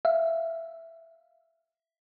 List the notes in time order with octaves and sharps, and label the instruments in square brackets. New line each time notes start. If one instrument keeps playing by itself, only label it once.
[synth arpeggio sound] E5 F5